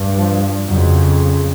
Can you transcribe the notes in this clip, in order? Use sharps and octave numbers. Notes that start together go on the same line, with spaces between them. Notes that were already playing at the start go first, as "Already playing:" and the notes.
Already playing: G2
F3
F2 C#3 F#3